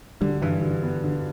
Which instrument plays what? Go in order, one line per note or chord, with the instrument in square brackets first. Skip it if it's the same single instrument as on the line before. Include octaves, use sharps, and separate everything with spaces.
[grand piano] D3 [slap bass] G3
[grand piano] G2 [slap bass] E3
[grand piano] D3
B3
D3